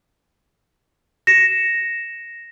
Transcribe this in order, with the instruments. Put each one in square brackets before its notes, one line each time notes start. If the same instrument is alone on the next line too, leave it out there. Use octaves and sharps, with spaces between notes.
[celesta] A#6 C#7 E7